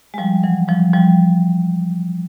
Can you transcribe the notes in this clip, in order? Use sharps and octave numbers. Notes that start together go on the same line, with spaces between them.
G#3
F3 G3
E3 F#3
F3 G3
F3 G3